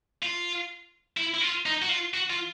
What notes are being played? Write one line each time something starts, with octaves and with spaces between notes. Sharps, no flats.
F4
E4
E4
F4
D#4
F#4
F4
F#4
F4